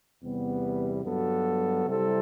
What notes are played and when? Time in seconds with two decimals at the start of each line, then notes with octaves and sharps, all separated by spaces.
0.23 E2 C3 G3 B3
1.04 G2 F#3 B3 F#4 A4
1.86 C3 G3 C4 E4 A4